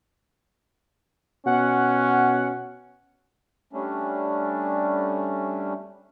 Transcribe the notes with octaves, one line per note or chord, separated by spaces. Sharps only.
B2 C#4 F#5
G3 A3 C#4 D4